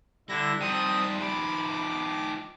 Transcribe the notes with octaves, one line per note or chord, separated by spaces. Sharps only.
D3 G3 E4 A#6
D#3 F3 G3 C4 D#6
B5 D6